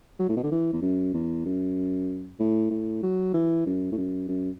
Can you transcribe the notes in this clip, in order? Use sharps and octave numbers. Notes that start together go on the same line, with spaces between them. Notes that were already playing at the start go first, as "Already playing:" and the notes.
F#3
A2
B2
D3
E3
E2
F#2
E2
F#2
A2
A2
F#3
E3
F#2
A2
F#2
F#2